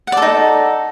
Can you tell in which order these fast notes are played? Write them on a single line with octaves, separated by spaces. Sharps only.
F#5 D5 A4 D#4